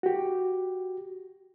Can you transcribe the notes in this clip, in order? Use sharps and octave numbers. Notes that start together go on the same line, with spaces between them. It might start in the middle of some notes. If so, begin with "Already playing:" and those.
F#4 G4